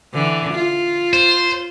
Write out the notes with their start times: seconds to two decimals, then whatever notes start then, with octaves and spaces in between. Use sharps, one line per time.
0.14 D3 E3
0.53 F4
1.13 C5